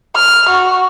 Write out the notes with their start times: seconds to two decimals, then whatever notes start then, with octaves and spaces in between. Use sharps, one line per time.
0.15 F6
0.49 F#4